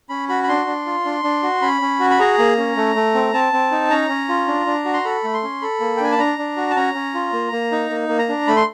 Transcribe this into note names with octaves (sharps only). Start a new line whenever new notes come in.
C#4 B5
F#4 B5
B5
D4 C6
D4
F4
D4
D4
F#4
C#4 B5
C#4
F#4
B5
G#4 A#5
A#3
C#4
A3
A3
C4
C4 A5
C4
D#4
C#4 A#5
C#4
F4
D4
D4
F#4
C6
A4 B5
A3
C6
C#4
A4 B5
A#3
G5
D4 G#5
A5
D4 A#5
D4
F#4
A5
C#4 A#5
C#4
F4
A#3
A#3
D#4
A#3
A#3
A#5
D4
A3 B5
C6